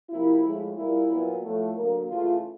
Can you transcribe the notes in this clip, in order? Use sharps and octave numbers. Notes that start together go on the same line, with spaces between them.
C3 F3 A#3 E4
A2 F3 G#3
A#2 G3 A#3 E4
A#2 F#3 B3
A2 F3 A3
D3 F#3 A#3
C#3 E3 A3 F4